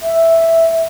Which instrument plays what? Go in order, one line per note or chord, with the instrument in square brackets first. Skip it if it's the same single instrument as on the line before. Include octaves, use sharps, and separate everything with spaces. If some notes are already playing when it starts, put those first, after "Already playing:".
[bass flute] E5